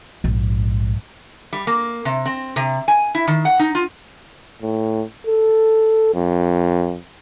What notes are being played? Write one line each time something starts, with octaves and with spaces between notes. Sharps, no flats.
A#1 G#2
G3
A#3
C3
C4
C3
G#5
E4
D#3
F#5
D#4
F4
A2
A4
F2